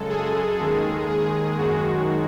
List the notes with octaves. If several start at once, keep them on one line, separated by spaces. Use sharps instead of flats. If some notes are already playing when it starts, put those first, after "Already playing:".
Already playing: F#2 C#3 G#3 A4
G#4
D#2 D#3 G#3
G#4
F#2 D#3 G#3 F#4